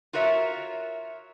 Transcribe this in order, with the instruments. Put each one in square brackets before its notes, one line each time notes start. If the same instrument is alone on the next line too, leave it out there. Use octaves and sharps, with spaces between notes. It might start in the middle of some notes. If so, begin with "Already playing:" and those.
[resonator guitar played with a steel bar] F4 F#4 A#4 C#5 E5